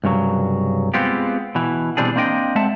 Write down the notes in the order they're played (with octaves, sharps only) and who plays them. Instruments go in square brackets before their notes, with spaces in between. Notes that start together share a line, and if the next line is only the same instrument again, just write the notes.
[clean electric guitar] C2 G2 C#3 F#3
G#3 B3 C4 F4 G4
B2 E3
B2 E3 G3 C4 D4 G#4
A#3 C4 D4 D#5 G5
G#3 A3 C4 E5 F#5 A5